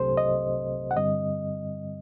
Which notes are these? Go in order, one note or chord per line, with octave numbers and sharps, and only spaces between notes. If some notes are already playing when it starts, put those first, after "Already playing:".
Already playing: C2 C3 F#3 A3 C4 G4 A4 C5
D#5
F#5
G2 D3 G3 C4 D#5